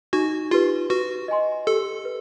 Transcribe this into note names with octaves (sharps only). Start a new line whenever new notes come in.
D#4 F#4
F4 G4 B4
F#4 B4
D#5 G#5 C6
G4 A4
B4